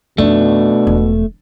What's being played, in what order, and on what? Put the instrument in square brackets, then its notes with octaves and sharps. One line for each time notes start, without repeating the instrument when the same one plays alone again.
[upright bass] F2 D#3 [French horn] B2 [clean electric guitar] A3 [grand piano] D4
[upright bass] E1